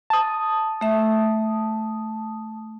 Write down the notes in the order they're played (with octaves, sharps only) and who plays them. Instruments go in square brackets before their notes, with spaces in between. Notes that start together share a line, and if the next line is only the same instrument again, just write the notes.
[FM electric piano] A5 D#6
[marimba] A3 E5